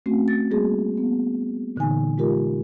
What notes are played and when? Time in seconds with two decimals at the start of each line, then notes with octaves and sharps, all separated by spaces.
0.06 A3 C4 C#4 F#4
0.28 A6
0.51 G3 A#3 F#4 G#4
0.97 B3
1.76 A#2 D3 E3 D#4 G#5
2.18 G#3 F4 G4 A#4